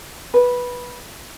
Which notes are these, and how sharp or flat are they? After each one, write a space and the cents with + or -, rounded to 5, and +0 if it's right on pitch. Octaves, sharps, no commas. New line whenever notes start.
B4 -10